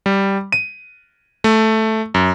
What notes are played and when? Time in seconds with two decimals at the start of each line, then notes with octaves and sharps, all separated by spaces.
0.06 G3
0.52 D#7
1.44 A3
2.14 F#2